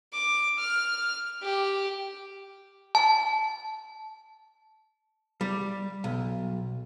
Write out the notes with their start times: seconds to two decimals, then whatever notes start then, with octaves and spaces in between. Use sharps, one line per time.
0.13 D6
0.59 F6
1.42 G4
2.95 A5
5.41 G3
6.04 B1